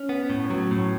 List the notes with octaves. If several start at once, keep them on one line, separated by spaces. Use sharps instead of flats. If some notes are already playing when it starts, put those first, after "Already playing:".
Already playing: C#4
B3
A2
F#3
A2